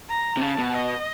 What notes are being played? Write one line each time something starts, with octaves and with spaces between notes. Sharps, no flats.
A#5
C3
C#3 A5
B2
D#5